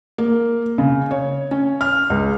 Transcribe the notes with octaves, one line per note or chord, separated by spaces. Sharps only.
A#3
C#3
C#5
C#4
F6
C#2